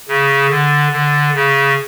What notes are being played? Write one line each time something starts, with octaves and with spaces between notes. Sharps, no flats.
C#3
D3
D3
C#3